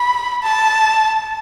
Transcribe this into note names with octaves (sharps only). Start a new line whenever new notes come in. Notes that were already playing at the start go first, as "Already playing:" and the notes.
Already playing: B5
A5